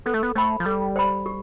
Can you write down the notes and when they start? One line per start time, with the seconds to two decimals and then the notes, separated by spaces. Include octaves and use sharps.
0.06 B3 A4
0.14 A3
0.23 B3
0.35 A3 C5 G5 B5
0.60 F3
0.65 G3 A4
0.96 C5 G5 B5
1.26 G4